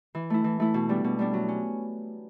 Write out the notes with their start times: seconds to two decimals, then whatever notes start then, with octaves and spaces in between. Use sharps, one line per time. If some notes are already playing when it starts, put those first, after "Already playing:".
0.15 E3
0.30 A3 E4
0.44 E3
0.60 A3 E4
0.74 B2
0.89 G3 B3 D4
1.04 B2
1.19 G3 B3 D4
1.33 F#3
1.48 C#4